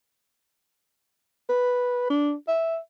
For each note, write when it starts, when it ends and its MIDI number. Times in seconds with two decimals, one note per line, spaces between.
1.49 2.05 71
2.10 2.33 62
2.48 2.78 76